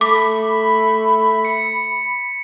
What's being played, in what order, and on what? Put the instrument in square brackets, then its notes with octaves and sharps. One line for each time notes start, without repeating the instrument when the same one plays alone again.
[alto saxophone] A3 [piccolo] B5 [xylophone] D6 [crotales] B6
[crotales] C#7